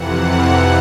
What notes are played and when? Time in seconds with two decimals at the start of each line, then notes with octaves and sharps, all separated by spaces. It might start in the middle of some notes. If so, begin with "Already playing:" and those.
Already playing: F2 C3 E3 F#5